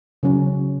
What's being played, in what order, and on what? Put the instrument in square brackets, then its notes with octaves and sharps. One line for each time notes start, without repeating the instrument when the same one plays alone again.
[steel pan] C#3 F#3 C#4